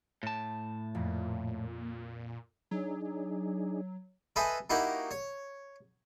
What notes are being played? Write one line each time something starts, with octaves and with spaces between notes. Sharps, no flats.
A2 A5
F2 A#2
F#3 D4 D#4 G#4
A4 B4 C5 D#5 E5 G#5
A#3 D#4 E4 F#4 G4 A#4
C#5